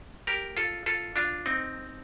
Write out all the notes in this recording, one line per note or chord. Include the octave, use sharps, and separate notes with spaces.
G4 A#4
F4 A4
F4 A4
D4 F4
C4 D#4